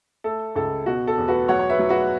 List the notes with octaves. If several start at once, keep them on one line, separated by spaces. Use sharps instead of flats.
A3 A4
C#2 A4
B2 F#4
A4
E2
F#4 B4
F#3 C#5 F#5
C#5
B4 E5
F#3
F#4 B4